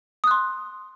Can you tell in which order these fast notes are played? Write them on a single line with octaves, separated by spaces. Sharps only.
D#6 F#6 C6